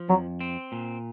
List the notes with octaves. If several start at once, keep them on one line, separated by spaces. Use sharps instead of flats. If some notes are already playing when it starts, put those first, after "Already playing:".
Already playing: F3
F2 F#3
C4
A#2